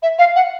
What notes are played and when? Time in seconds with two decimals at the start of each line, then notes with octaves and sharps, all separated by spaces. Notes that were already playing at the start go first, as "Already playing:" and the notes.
0.03 E5
0.19 F5
0.36 F#5